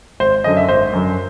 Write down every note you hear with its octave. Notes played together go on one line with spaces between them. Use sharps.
G#1 C5
F#2 D3 F#3 D#5
E5
G#1 C5
F#2 D3 F#3